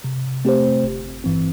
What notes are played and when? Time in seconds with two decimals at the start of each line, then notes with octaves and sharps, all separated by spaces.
0.04 C3
0.45 A3 C4 G4 C5
0.83 G1
1.24 G2 E3 C4